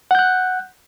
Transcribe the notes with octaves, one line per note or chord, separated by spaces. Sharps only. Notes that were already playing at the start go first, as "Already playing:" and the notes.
F#5 F#6 G6